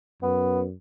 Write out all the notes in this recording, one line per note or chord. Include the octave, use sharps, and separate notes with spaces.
F#2 B3